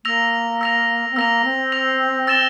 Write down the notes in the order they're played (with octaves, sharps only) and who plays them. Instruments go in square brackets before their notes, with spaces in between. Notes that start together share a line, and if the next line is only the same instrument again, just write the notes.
[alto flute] A#3 [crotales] E6 A#6 F7
[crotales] E6 A#6 F7
[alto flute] C4
[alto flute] A#3 [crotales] E6 A#6 F7
[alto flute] C4
[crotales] E6 A#6 F7
E6 A6 E7 G7